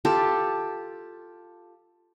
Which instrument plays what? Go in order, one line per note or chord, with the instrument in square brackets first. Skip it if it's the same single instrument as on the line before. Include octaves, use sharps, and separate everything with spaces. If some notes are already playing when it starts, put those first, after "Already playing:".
[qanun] F4 G4 A4